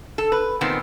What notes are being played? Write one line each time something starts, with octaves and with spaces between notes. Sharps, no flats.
A4
B4
A#2 D#3 B3 C4